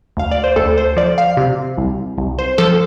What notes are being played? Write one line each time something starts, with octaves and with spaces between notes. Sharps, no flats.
D2 F5
D5
C5
D2 A4
C5
F3 D5
F5
C3
C2
C2
C5
F3 A4